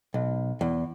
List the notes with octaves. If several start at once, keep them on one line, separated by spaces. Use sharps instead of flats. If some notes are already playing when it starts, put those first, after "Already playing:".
B1
E2